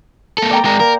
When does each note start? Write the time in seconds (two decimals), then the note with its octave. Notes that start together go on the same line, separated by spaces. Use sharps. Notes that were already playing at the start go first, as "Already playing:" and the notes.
0.38 A#3 A4
0.51 D5 G5 A#5
0.65 G#3 A#4 A#5
0.80 A#3 A#4